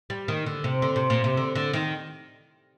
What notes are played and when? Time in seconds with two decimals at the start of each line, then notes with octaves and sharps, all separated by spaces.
0.10 G3
0.28 D#3
0.46 D3
0.64 C3
0.82 D3
0.96 C3
1.10 A#2
1.24 C3
1.37 D3
1.55 D3
1.73 D#3